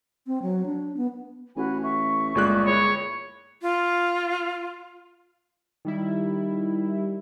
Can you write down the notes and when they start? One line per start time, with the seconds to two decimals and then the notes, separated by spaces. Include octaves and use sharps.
0.27 C4
0.42 F#3
0.66 D4
0.97 B3
1.56 A1 F#4 G#5 B5
1.82 E5 C#6
2.35 G1 A#2 G#3 F#6
2.66 E4 G#4 C#5 B5
3.62 F4
5.85 D#3 G3 E4